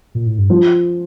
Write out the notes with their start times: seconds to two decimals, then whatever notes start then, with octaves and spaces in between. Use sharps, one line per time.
0.15 A#2
0.26 A2
0.38 G2
0.50 F3